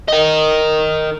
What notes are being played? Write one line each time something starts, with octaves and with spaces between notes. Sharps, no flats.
A#4 D#5